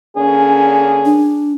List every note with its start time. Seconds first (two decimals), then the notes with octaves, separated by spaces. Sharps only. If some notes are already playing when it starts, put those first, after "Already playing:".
0.16 D3 A#3 C#4 G#4
1.06 D4